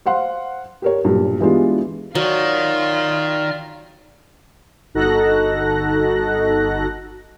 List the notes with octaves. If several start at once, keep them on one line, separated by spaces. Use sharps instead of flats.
C5 F5 F#5 C6
G4 A#4 C#5
B1 G2 A#2
E3 G3 G#3 B3 D4 F4
D#3 F#3 F4 D5 F6
G1 D#4 F#4 A4 F#6 A#6